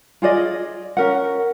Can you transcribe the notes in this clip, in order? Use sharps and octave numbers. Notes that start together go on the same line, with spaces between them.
F4 G#4 D5 D#5
C#4 A#4 F#5